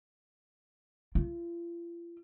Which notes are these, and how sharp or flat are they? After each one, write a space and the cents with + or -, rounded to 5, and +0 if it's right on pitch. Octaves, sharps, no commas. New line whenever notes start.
F4 -40